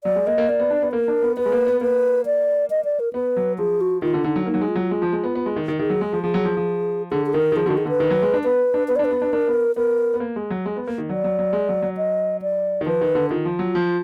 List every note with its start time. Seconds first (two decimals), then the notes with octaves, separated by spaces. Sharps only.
0.04 F#3 D5
0.16 G#3
0.27 A#3 D#5
0.38 A#3
0.48 A#3 D5
0.60 B3
0.70 D4
0.82 B3
0.93 A#3 A#4
1.08 D4
1.22 B3
1.37 B3 B4
1.45 G#3
1.52 A#3
1.67 B3
1.81 A#3 B4
2.26 D5
2.70 D#5
2.85 D5
3.00 A#4
3.13 B3 B4
3.37 F#3
3.58 F3 G#4
3.81 F#4
4.02 D#3 F4
4.14 D3
4.24 D3 D#4
4.36 F#3
4.46 A#3 D#4
4.54 F#3
4.61 G#3
4.68 F4
4.75 F#3
4.91 G#3
5.02 F3
5.12 G#3
5.24 B3
5.35 B3
5.46 G#3
5.56 D#3
5.68 D#3
5.79 D#3 G#4
5.90 F#3
6.01 G#3
6.13 F3
6.23 F3 G#4
6.34 F#3
6.45 F3
6.57 F3
7.11 D3 G#4
7.26 G#4
7.33 D#3 A#4
7.52 D#3
7.56 F3 G#4
7.66 D3 D#3 F#4
7.78 G#4
7.85 D3 B4
8.00 D#3
8.10 F#3
8.22 G#3
8.34 D4
8.44 B3 B4
8.74 D4
8.88 B3 B4
8.96 D5
8.99 D4
9.05 B4
9.11 B3
9.22 D4
9.33 D4 A#4
9.47 B3
9.76 B3 A#4
10.14 B3
10.20 A#3
10.36 G#3
10.50 F#3
10.66 G#3
10.76 B3
10.88 A#3
10.98 D#3
11.09 F#3 D5
11.24 F#3
11.39 F#3
11.53 G#3
11.69 F#3
11.82 F#3
11.97 D#5
12.42 D5
12.81 D#3
12.86 F3 B4
13.01 D#3
13.15 D3
13.31 D#3 F4
13.45 F3
13.59 F#3
13.75 F3